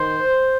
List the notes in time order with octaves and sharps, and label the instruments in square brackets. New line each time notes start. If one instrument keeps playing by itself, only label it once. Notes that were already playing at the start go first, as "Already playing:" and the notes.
Already playing: [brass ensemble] D#3 C5